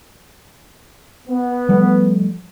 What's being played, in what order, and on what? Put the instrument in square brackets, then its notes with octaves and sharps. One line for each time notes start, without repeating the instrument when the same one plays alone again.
[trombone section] B3
[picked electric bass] F3 G3 A3